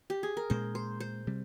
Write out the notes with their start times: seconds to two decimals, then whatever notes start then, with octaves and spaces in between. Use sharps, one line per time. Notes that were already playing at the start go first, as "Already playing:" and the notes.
0.10 G4
0.23 G#4
0.37 A#4
0.50 A#2 G#3 C#4 C5
0.75 C5
1.00 C5
1.27 C3 G3